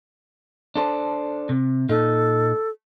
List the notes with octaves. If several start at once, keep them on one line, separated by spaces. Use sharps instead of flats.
D4 A4 C5
C3
A#2 D#4 A4